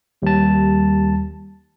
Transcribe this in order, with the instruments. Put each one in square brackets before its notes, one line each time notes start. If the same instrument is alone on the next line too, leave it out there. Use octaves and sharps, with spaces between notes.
[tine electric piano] D#2 A5 [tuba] G3